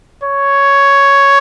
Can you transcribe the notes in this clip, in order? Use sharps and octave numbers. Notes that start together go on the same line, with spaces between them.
C#5